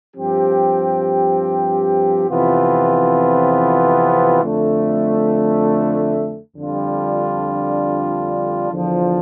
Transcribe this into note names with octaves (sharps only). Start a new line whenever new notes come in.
G2 F3 C4 G4
F2 C3 E3 B3 F4
F2 D3 A3
F2 D3 G3 D4 F4
E2 D3 F3